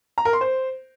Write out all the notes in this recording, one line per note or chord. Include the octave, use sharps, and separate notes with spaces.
A#5
A#4
C6
C5